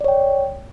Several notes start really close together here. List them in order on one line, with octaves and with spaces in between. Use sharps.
D5 C#5 G5